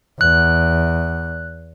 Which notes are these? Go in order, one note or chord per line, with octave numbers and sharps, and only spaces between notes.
E2 F#6